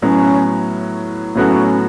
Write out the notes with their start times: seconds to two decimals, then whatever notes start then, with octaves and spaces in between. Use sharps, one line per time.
0.02 A2 F#3 B3 C#4
1.35 A2 F#3 B3 C#4 F#4 A4